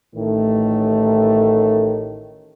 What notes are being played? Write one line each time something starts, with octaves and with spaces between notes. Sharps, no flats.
A1 A2 D#3 A3